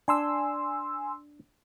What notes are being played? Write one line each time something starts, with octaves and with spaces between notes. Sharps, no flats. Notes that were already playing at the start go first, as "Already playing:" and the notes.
D4 G#5 C6 E6